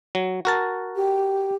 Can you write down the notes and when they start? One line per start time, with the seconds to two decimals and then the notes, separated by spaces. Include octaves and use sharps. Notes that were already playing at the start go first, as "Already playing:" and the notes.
0.15 F#3
0.45 F#4 A#4 A5
0.96 G4